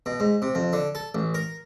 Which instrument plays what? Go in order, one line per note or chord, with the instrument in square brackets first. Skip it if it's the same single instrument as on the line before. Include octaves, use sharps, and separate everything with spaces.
[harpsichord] B2
G#2
C3
F2
D3
A4
A1
A#4